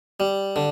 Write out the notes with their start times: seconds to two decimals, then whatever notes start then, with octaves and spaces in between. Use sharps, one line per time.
0.20 G3
0.56 D3